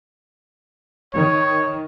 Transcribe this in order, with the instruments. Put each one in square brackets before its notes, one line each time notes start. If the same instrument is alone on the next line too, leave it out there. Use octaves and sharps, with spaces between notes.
[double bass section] D#3 [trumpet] C#5